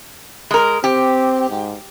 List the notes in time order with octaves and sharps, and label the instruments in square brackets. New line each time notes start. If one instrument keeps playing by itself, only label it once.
[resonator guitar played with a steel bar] G#3 A#4
[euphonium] C4 [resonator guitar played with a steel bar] G4
[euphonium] G#2